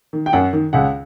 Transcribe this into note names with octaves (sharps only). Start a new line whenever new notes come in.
D#3
G5
F#2 F#5
D#3
C#2 F#5